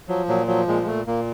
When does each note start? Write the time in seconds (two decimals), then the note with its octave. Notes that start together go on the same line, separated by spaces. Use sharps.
0.08 F3 F#3
0.28 A#2 F#3
0.47 F3 F#3
0.67 A#2 G#3
0.83 G#3
0.87 A#2 A3
1.07 A#2 A#3